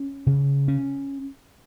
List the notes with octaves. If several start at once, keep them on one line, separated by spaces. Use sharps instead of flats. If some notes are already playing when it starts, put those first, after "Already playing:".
Already playing: C#4
C#3
C#4